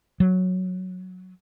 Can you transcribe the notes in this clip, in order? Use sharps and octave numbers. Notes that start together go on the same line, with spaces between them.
F#3